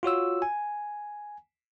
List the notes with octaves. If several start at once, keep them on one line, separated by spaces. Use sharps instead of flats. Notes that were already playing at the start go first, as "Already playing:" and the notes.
F4 F#4 C#5 E6
G#5